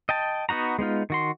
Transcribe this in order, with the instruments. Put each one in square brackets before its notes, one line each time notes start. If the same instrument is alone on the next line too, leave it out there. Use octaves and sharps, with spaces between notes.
[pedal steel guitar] D#5 G5 A5
B3 D#4 F#4 A#5
G#3 B3 D#4 F4
D#3 F#4 C6